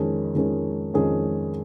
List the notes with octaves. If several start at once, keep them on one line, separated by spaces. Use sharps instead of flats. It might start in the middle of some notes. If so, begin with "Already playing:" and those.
Already playing: F2 D#3 G#3 C#4 G#4
F2 D#3 G#3 C#4 G#4
F2 D#3 G#3 C#4 G#4